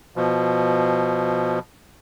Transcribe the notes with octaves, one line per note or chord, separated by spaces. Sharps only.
B2 F3